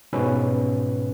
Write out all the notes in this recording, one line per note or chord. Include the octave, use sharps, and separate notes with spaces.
G#2 B2 C#4 B4